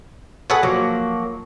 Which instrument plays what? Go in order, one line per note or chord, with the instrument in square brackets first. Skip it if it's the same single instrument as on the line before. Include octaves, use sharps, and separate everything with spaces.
[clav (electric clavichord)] G#4 A4 C#5 [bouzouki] B4 F#5
[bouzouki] F3 F#3 A#3